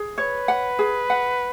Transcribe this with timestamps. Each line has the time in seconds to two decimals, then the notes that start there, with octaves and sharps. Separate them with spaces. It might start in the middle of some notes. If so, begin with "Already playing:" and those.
Already playing: G#4
0.18 B4 C#5
0.48 F#5
0.79 G#4
1.10 F#5